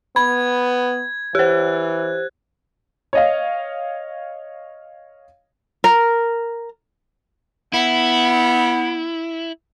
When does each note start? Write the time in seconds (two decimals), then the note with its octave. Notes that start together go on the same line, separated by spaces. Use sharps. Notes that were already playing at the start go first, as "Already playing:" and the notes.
0.16 B3 B5 G#6
1.35 E3 G4 C5 F#6
3.13 C#5 D#5 F5
5.84 A#4
7.73 B3 E4